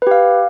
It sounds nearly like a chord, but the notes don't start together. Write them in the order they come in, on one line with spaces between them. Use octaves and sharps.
B4 G4 F5